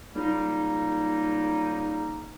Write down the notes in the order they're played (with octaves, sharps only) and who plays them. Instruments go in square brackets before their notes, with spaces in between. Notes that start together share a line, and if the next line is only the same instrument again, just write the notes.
[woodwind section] C#2 G3 A#3 D#4